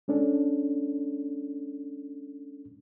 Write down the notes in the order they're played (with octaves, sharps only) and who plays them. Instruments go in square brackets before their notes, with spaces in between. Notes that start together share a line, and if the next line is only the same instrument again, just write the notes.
[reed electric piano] G#3 C#4 D4 A4